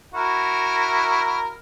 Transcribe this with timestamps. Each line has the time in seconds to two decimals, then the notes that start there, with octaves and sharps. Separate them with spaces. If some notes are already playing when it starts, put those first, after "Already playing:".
0.14 E4 F#4 A#4